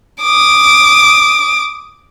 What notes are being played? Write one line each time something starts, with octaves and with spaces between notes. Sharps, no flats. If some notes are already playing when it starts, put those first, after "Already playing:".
D6 D#6